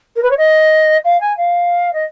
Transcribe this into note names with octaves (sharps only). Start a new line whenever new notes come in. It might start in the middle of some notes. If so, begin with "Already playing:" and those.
A#4
B4
C#5
D#5
F5
G#5
F5
D#5